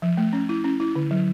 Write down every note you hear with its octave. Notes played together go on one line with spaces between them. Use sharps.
F3
A3
C#4
E4
C#4
E4
D3
F#3